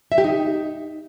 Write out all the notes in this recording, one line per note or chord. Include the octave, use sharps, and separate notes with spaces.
E5
G4
D#4